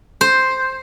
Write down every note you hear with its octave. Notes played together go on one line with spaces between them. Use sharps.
C5